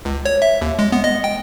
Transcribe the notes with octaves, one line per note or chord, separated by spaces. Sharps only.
C#2
C#5
E5
D#2
G#3
B3
D#5
G5